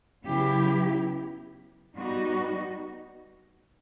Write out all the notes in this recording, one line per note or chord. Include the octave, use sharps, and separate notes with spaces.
C#3 F#3 B3 E4 G4
G3 B3 D#4 F#4